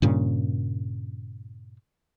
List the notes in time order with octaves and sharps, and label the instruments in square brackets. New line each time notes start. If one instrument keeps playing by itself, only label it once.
[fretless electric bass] G2 A#2 C#3